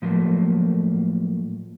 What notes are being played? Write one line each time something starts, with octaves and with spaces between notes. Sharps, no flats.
A2 F3 F#3 A3 A#3